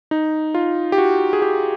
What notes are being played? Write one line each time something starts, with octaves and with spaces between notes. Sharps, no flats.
D#4
F4
G4
F#4
G#4
G4